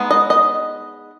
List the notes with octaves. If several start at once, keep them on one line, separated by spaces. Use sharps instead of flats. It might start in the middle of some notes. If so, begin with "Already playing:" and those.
Already playing: G#3 B3 D#4
D#5
D#5